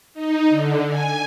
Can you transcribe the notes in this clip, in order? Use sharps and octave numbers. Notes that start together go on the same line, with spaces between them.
D#4
D3
G#5